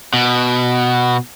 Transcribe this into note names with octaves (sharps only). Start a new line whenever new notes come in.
B2